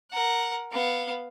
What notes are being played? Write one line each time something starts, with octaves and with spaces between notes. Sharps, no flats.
A#4 F#5
B3 F5